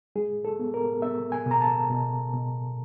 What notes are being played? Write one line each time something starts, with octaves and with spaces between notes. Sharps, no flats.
G#3 G#4
A4
B3
A#4
B3 E5
G#5
B2
A#5
A5
B2
B2